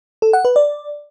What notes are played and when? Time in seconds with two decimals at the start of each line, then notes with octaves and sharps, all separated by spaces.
0.22 A4
0.33 F#5
0.45 B4
0.56 D5